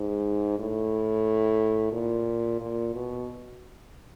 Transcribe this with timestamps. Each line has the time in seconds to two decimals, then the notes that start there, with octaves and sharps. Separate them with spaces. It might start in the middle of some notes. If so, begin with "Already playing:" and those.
Already playing: G#2
0.59 A2
1.92 A#2
2.60 A#2
2.94 B2